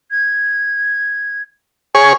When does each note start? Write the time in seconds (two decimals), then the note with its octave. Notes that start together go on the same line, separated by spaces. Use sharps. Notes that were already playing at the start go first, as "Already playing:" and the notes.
0.11 G#6
1.95 G#4 C#5 G#5